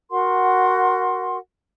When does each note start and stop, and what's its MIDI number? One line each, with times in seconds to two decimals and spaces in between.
0.11 1.37 66
0.11 1.37 70
0.11 1.37 78
0.11 1.37 84